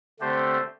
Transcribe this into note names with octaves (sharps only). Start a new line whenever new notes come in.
D3 A3 C4 G4 C5